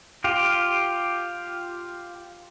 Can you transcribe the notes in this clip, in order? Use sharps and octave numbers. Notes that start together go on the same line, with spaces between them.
F4 G4